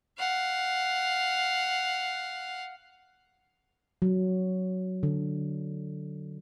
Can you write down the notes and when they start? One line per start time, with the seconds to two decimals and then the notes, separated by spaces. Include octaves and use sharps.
0.19 F5 F#5
4.02 F#3
5.03 D3